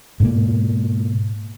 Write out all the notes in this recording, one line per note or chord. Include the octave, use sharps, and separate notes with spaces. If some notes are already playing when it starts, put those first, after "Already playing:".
G#2 B2 A#3